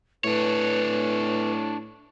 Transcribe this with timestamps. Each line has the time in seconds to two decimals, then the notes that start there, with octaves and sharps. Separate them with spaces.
0.24 A2 D4 B4 C#5